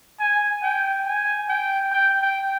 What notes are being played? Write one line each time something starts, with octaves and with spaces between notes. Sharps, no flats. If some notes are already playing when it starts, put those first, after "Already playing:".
G#5
G5
G#5
G5
G5
G5